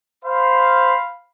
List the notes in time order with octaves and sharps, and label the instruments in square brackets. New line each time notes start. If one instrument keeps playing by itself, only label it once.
[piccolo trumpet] C5 [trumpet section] F5 B5